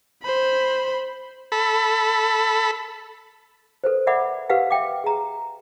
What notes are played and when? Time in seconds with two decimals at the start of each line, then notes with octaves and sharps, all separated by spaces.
0.23 C5 B5
1.52 A4 B5
3.84 A4 B4 C5
4.07 A#4 D5 E5 F#5 B5 D6
4.50 G4 A#4 B4 F5 F#5
4.71 E5 F5 G5 D6
5.04 G#4 A#5